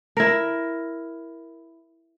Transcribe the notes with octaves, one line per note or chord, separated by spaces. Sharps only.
E4 A#4